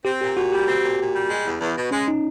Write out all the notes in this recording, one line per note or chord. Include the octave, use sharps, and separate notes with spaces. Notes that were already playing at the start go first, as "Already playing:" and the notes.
C4 G4
A#2 G4
A#2 F#4
G3 G4
C4
A#2
A#2
G3
G#3
E2
E2
B2
G#3 C#4
D#4